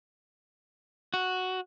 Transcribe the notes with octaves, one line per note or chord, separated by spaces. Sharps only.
F#4